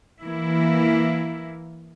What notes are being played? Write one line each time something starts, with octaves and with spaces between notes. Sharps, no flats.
E3 A#3 E4